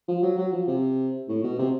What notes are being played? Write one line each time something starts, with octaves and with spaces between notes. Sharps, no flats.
F3
F#3
F#3
F3
C3
A2
B2
C3